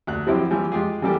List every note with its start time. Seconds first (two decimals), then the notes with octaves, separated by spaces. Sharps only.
0.07 D2 F#6
0.27 F3 F#3 C4 E4 G4
0.51 E3 F3 G3
0.72 G#3 F4 G4 G#4
1.02 E3 F#3 G3 A#3 G4 A4